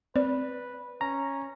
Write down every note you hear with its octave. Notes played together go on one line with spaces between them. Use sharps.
C4 B4 D5
C#4 A#5